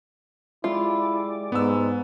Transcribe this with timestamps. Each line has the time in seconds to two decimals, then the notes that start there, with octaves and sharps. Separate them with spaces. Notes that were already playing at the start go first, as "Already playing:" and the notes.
0.64 G3 G#3 E4 F4 D5
1.52 G#2 B3 E6